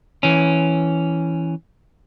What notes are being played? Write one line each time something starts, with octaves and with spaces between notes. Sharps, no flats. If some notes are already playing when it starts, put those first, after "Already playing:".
E3 C#4